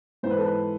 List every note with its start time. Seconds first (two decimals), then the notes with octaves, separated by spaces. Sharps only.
0.23 G#2 E3 B3 C5
0.30 B4
0.37 A4
0.45 B4